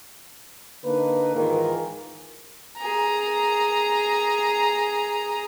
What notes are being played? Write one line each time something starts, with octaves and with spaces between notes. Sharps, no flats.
D3 A#3 D#4 B4
G#2 D#3 E3 F4 G#4 A#4
G#4 A#5